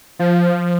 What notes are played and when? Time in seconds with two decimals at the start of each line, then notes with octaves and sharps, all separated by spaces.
0.19 F3